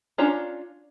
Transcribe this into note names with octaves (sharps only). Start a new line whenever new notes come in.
C#4 D4 F4 C#5 A#5